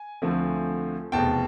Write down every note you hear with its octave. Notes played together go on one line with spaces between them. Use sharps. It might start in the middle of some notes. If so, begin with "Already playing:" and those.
Already playing: G#5
D2 D3 F3 A3 C4
F1 E2 B2 G5 A5